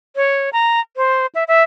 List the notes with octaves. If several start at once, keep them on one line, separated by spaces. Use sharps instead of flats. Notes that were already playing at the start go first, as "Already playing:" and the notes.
C#5
A#5
C5
E5
E5